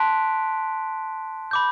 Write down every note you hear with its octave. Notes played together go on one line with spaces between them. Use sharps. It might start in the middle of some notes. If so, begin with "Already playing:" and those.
Already playing: A5 C6 F#6 B6 D7
B5 D6 G6